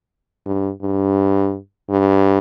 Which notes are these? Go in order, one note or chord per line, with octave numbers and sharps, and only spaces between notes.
G2
G2
G2